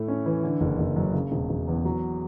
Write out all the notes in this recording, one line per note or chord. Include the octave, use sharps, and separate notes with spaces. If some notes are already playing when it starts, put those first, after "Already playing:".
Already playing: A2 A3
C#4
E3
D3
F#1
F#1
F#2
C#3
E1
E1
E2
F#3